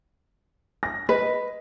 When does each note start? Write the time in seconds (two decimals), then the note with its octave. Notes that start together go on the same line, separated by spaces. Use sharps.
0.83 A#6
1.09 B4 D#5